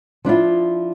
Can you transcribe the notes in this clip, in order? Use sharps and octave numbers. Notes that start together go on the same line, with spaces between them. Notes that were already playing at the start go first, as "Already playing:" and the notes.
F3 D4 E4 F4